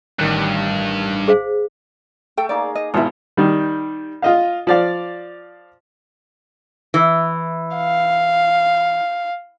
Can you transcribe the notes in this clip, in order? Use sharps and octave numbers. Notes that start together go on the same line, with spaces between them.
A1 G2 D#3 F#6
G#4 C5 F5
A3 A4 G5
A#3 D#4 G#4 D5
D#5
G#1 B2 E4 F4 E5
D#3 G3
F4 D#5 F5
F3 D5 F5
E3
F5